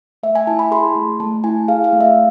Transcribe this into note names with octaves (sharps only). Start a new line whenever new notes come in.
A3 E5
G#5
E4 A5
B5
G#4 C6
A3
A3 A5
E4 G#5
G#4 F5
F5
A3
E5